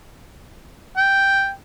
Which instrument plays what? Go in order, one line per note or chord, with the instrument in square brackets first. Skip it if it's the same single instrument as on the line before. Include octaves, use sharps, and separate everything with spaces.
[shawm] G5